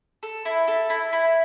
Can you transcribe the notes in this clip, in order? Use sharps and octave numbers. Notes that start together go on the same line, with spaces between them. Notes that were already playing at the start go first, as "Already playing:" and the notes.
A4
E4
A4
E4
E4